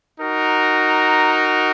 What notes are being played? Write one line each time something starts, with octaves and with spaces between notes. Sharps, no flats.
D#4 F#4 A#4